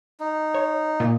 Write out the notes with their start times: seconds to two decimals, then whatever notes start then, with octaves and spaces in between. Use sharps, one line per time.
0.20 D#4
0.54 C#5
1.00 A#2